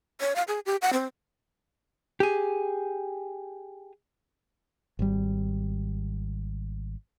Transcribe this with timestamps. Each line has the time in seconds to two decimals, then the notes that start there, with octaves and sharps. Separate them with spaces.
0.21 C#5
0.36 F5
0.48 G#4
0.66 G4
0.82 F#5
0.93 C4
2.20 G4 G#4
4.99 G#1 G3